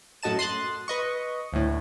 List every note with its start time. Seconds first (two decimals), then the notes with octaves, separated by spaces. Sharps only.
0.23 F#2 A2 F#4 D#5 A5 E7
0.39 C6 D#6 F#6 A6
0.88 B4 D#5 C#6
1.53 D2 A2